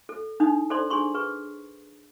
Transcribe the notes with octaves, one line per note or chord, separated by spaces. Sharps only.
A4
D4 D#4 D#6
A4 C5 D5 C6
D4 G#4 C6 C#6
G#4 B4 C#6